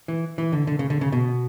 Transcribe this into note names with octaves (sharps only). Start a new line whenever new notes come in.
E3
E3
D3
D3
C#3
D3
C#3
B2